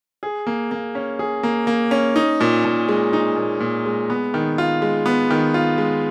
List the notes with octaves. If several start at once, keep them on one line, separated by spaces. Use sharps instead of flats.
G#4
A#3
A#3
C#4
G#4
A#3
A#3
C#4
D#4
A#2
A#2
G#3
D#4
A#2
A#2
G#3
B3
D#3
F4
G#3
B3
D#3
F4
G#3